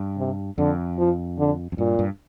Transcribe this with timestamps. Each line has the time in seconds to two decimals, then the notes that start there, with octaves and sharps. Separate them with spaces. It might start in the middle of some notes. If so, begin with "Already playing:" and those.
Already playing: G2
0.17 C3
0.58 F2 D3
0.98 F3
1.38 D3
1.72 F2
1.78 G2 A#2
1.99 G2